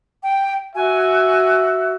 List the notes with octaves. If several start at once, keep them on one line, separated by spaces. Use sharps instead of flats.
G5
F#4 E5 G#5